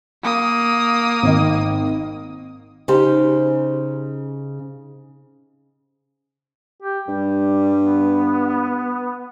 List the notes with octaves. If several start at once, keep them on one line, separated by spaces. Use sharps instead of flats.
A#3 D#6
G#1 D#3
C#3 D#4 G4 C5
G4
G2 G3
B3